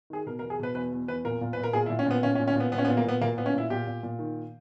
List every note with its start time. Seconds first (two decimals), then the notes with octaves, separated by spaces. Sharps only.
0.10 D#3 G#4
0.26 B2 A#4
0.39 A#4
0.42 E2
0.50 G#4
0.59 B2 B4
0.75 E2 B4
0.92 E2
1.08 E2 B4
1.25 A#2 A#4
1.41 A#2
1.53 A#2 B4
1.64 A#4
1.73 A#2 G#4
1.86 E4
1.90 A#2
1.99 C#4
2.06 A#2 B3
2.23 A#2 C#4
2.35 C#4
2.39 A#2
2.47 C#4
2.55 A#2 B3
2.72 A#2 B3
2.78 C#4
2.85 B3
2.88 A#2
2.97 A#3
3.04 A#2 B3
3.21 A#2 A#3
3.38 A#2 B3
3.46 C#4
3.54 A#2 E4
3.70 A#2 G4
3.87 A#2
4.03 A#2
4.19 D#3